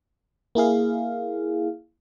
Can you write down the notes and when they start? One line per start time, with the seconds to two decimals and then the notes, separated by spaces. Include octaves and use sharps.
0.55 A#3 E4 G#4 F5